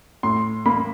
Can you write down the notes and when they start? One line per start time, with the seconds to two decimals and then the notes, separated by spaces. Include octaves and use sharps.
0.23 A2 C6
0.66 A#3 B5